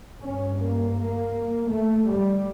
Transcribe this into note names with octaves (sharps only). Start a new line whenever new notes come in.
G2 C#4
A#3
A#3
A3
G3